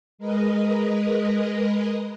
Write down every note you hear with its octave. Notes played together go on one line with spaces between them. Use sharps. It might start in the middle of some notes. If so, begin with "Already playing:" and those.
G#3 A#4 B4 D#5